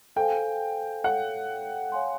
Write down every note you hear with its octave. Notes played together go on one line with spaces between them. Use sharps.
A4 C5 F5 G5 G#5
A4 C#5 F5 F#5
C#5 F5 G#5 C6